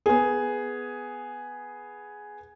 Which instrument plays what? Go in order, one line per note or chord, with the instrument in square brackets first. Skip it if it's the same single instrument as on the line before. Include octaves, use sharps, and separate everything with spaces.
[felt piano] B3 G#4